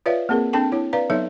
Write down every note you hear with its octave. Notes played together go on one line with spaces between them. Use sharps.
F4 B4 C#5 D5 E5 F5
A#3 C4 G#4 A#4
C4 D4 A4 G5 A5
E4 C#5
B4 D5 F5 A#5
F#3 B3 D#4 A4 C#5 E5